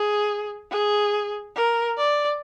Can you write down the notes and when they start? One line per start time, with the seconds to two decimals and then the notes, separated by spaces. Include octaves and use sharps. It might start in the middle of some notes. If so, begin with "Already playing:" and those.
Already playing: G#4
0.71 G#4
1.55 A#4
1.97 D5